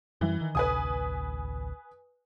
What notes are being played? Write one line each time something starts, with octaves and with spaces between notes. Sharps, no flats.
F#2 E3 G3
D#3
A1 D2 C3 B4 G#5 D#6